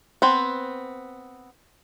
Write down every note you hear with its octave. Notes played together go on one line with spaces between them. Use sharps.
B3 C4